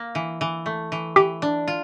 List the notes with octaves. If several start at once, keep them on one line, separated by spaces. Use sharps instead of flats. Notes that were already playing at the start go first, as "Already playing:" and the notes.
Already playing: A#3
E3
E3
A3
E3
E3 G4
D4
F4